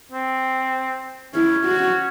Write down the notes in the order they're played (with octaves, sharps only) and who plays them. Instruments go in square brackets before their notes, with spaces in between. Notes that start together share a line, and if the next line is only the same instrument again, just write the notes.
[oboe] C4
[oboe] C#4 [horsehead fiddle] E4
[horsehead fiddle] F#4